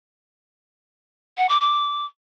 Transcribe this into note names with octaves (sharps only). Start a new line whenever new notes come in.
F#5
D6
D6